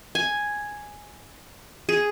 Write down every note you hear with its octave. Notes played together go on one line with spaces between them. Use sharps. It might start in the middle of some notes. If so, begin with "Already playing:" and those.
G#5
G#4